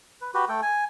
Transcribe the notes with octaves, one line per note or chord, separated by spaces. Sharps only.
B4
F#4 G4 B4
A3 A4 G5
G#5